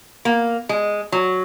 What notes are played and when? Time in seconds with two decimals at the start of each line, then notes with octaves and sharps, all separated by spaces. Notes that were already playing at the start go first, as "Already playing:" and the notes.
0.25 A#3
0.69 G#3
1.12 F#3